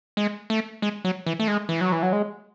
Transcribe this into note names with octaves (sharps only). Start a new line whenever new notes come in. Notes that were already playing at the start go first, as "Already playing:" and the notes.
G#3
A3
G#3
F#3
E3
A3
G#3
E3
F#3
E3
F#3
G#3